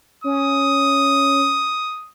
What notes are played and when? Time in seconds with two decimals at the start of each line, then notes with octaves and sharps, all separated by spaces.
0.24 C#4 D#6